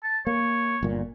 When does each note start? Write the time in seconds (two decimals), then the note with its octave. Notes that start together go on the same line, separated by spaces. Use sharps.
0.04 A5
0.27 A#3 C#5
0.83 G1 A#2